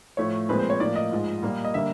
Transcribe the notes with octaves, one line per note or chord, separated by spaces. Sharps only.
A2 F3 A3 C#5
A#2 F3 G#3 C4 B4
C5
C#5
A2 F3 A#3 D5
D#5
G#2 F3 G#3
A#2 G3 A#3
D#5
D3 G3 A#3 E5